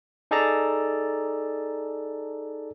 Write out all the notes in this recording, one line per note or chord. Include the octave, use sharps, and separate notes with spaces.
D#4 G#4 A4 D5 A5 A#5